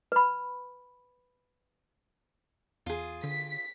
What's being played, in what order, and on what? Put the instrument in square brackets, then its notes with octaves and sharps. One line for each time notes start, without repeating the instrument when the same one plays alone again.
[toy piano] B4 B5
[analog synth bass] E2 [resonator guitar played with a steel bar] F4 G#4
[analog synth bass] D3 [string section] B6